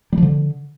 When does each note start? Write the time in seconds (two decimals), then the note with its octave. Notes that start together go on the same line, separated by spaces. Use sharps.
0.13 G3
0.18 F3
0.23 D3